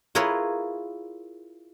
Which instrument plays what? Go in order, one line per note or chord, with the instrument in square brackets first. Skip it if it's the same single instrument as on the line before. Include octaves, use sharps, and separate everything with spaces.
[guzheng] E4 F4 G#4 A#4 B4 C#5